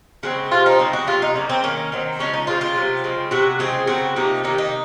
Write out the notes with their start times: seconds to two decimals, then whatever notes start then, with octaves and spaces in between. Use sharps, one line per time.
0.23 C#3 G#3 C4 F#4
0.51 C3 F3 C4 F4
0.66 D#4
0.79 C#3 G#3 C4
0.93 F#4
1.07 C3 D#3 F#3 F4
1.22 D#4
1.35 C#3 F#3 A#3 C#4
1.49 C4
1.64 D#3 A#3 C#4
1.92 D#3 F#3 C4
2.19 C#3 F3 G#3 C#4
2.33 D#4
2.47 C#3 G#3 C4 F4
2.61 F4
2.76 C3 F#3 C4
3.04 C#3 G#3 C4
3.31 C3 D#3 F#3 F#4
3.59 C#3 F3 G#3 C4 G#4
3.87 C#3 F#3 C4 F#4
4.16 C3 F3 A#3 D#4
4.44 C3 D#3 A#3 D#4
4.58 D#4